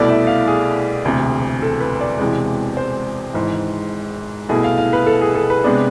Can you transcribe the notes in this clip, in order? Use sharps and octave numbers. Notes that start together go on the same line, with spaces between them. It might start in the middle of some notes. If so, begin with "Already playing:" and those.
Already playing: C2 B2 A3 E4 D5
E5
F5
G#4
E1 D2 C3
A4
B4
D5
E1 E2 C3 E3 G#3
C5
G#1 G#2 E3 C5
C2 B2 A3 E4 G#4
F5
F5
B4
A4
G#4
A4
B4
C3 G#3 B3 D4